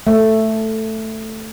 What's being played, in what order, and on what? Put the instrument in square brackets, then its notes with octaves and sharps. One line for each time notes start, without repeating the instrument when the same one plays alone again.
[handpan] A3